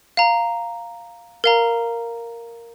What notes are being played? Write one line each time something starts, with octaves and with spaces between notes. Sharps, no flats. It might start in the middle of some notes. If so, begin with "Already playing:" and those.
F5 A#5
A#4 F5 A#5